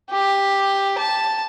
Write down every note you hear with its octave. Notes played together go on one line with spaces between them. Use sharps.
G4
A5